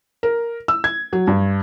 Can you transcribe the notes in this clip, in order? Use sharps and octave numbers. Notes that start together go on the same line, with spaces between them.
A#4
E6
G#6
F#3
G2